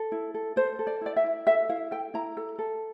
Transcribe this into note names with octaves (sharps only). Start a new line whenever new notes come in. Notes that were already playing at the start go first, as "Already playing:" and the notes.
Already playing: A4
E4
A4
A4 C5
A4
D5
E4 D5
E5
E4
A4 E5
E4 F5
A4 G5
E4 A#5
A4
A4